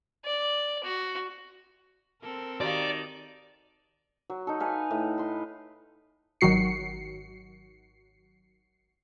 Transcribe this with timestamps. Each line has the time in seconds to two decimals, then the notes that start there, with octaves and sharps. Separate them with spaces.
0.25 D5
0.83 F#4
2.21 C4 A4 A#4
2.61 D#3 F#4 G4 D5 F5
4.30 F#3
4.47 D#4 A4
4.60 B4 F5 G#5
4.91 A2
5.18 B4 C6
6.41 G#1 D#3 F#3 F#4 C7 C#7